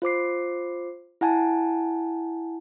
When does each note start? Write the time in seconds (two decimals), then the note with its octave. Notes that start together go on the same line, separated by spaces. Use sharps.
0.02 F4 C5 D6 C7
1.21 E4 F#5 G#5 A5